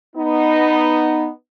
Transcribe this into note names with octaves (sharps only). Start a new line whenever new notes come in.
B3 D#4